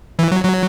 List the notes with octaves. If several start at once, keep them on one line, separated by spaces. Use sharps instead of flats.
E3
F#3
F#3